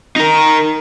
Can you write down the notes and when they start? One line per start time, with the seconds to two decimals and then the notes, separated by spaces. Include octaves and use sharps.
0.16 D#4 A#4